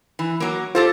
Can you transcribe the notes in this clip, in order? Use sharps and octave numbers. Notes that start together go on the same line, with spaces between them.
E3
F#3 A#3
F4 G4 A4 C5 A6